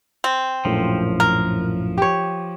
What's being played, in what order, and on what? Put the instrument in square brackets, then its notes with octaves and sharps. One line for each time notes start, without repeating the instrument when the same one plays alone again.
[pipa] C4
[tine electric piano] A#1 F#2 A2 [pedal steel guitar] F3
[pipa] A#4
[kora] G4 C#5